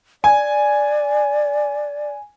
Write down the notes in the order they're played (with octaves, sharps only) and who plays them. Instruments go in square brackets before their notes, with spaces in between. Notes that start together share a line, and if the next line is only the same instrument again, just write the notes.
[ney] D5 [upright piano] G#5